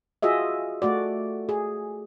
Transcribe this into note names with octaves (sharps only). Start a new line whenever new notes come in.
F4 F#4 G#4 D#5 E5
A3 F#4 D5
G#4